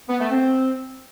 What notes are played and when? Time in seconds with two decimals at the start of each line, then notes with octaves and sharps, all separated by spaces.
0.09 B3
0.20 A3
0.30 C4